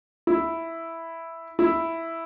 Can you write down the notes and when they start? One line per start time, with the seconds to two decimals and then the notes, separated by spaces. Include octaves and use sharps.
0.27 E4
1.59 E4